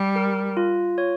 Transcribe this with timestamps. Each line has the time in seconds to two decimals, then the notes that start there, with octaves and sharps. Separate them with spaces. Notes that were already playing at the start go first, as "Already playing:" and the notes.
Already playing: G3
0.16 A#4
0.57 F4
0.98 C#5